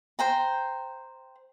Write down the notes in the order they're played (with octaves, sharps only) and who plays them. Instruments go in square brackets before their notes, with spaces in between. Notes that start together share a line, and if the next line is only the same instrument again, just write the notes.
[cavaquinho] C5 G5 A#5